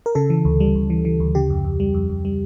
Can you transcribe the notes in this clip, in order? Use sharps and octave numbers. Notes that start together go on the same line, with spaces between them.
A#4
C#3 A4
E3
D2
G3
D2
E3
E3
D2
C#3 G4
F2
F2
G3
F2
F2
G3